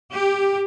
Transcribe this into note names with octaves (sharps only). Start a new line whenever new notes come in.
G4